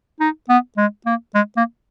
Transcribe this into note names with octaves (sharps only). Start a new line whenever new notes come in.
D#4
B3
G#3
A#3
G#3
A#3